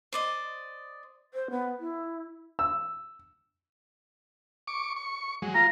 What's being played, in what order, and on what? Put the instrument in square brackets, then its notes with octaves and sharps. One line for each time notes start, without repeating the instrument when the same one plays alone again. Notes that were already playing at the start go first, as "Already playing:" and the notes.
[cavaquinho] C5 D5 D#5
[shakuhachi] C5
B3
E4
[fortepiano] E6
[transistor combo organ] C#6 D6
C#6
F#3 G#3
[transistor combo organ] F4 [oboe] A#5